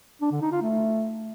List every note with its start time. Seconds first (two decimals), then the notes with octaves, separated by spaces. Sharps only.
0.21 D4
0.31 D3
0.41 D#4
0.52 F4
0.62 A3